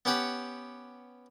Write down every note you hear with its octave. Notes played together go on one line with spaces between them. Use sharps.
B3 C#4 G4 F#5 G5